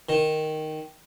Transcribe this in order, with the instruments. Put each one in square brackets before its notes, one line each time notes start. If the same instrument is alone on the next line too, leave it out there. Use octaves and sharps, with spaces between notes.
[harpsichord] D#3